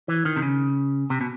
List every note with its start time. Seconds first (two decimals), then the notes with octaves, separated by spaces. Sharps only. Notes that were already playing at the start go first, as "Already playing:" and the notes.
0.08 E3
0.25 D#3
0.36 C3
0.42 C#3
1.10 C3
1.21 B2